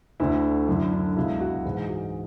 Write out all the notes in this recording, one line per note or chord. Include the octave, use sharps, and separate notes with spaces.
D2 D3 E4
F#2 D3 E4
D4
C#2 B2 E4
F#4
G#2 E3 G#4
F#4